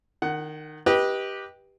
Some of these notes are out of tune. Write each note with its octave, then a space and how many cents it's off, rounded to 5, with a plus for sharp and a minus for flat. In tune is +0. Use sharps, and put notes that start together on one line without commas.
D#3 -20 F#5 +10
G4 +0 B4 -20 D#5 +10